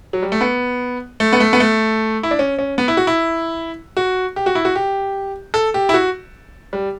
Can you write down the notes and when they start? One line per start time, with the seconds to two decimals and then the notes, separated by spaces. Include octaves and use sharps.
0.13 F#3
0.22 G3
0.32 A3
0.41 B3
1.20 A3
1.33 B3
1.40 A3
1.53 B3
1.60 A3
2.23 E4
2.31 D4
2.39 C#4
2.59 C#4
2.78 B3
2.88 E4
2.97 F#4
3.07 E4
3.97 F#4
4.36 G4
4.46 F#4
4.55 E4
4.65 F#4
4.75 G4
5.54 A4
5.74 G4
5.89 E4
5.94 F#4
6.73 G3